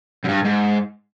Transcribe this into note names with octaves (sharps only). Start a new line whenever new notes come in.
F#2
G2
G#2